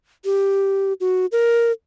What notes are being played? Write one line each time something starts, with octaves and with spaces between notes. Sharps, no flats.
G4
F#4
A#4